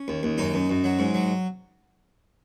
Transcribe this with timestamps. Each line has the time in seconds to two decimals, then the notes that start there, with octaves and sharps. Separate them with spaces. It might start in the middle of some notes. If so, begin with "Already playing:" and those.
Already playing: C#4
0.08 D#2
0.23 D#2
0.38 F#2 D#4
0.54 F#2
0.70 F#2
0.84 F#3
0.99 G#2
1.14 F#3